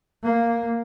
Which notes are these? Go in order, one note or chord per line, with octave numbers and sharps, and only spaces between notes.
A#3